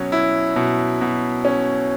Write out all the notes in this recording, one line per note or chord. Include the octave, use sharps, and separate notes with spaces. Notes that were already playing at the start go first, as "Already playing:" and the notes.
Already playing: B2 F#3 C#4
E4
B2
B2
C#4